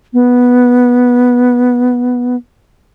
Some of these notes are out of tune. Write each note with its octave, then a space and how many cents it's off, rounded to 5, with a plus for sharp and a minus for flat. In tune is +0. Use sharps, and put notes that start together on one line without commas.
B3 -10